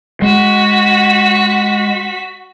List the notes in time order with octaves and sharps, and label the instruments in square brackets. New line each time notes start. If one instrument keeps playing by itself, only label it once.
[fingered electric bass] G#3 [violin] F#4 B6